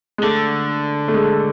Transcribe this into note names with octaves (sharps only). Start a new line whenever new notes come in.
G#3
D3 A3
A3
G#3